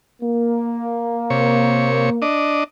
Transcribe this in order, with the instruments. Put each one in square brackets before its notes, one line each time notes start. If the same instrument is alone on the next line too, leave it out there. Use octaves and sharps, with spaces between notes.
[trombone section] A#3
[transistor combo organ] C3 C#5
D4 D#5